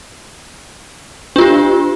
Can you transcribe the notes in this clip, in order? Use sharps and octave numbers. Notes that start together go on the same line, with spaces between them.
D4 F4 G4